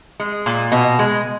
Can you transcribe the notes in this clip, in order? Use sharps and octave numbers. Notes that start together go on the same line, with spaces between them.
G#3
A#2
B2 D#5
G#3